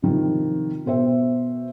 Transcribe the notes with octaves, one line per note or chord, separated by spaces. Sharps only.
C3 D#3 F3
B2 C5 E5